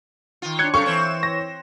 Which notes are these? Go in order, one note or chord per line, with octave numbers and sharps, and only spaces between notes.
D#3 F4
D4 C#5 F#6 G#6 C#7
F#2 C3 A4 F5 C#6
E3 C4 C#5 E7
A#6